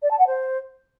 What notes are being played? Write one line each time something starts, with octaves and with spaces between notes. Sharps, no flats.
D5
A5
F#5
C5